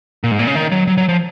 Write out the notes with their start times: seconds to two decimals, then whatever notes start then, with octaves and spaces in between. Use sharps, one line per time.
0.24 A#2
0.31 G#2
0.39 A#2
0.47 C#3
0.55 D#3
0.72 F#3
0.87 F#3
0.98 F#3
1.09 F3